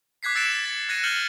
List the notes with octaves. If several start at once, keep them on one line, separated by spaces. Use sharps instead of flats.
D6 F#6 G#6 B6 C7
E6 A6 C#7 D7 E7
A6
F#6 G#6 A#6 C#7 D#7
F6 G6 A6 C#7 F#7